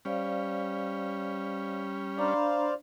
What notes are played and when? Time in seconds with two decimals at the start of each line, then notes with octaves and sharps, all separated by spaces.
0.05 G3 C#4 C5 D5 F5
2.18 D4 C5 D5 F5 A#5 B5